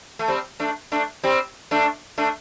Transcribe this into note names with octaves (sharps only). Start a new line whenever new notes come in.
A3
G3 C4
A3 D4
A3 D4
G3 C4
A3 D4
A3 D4